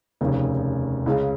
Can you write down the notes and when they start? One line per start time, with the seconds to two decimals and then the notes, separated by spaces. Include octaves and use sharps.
0.21 F1 D#2 C#3
1.06 C#2 C#3 G#3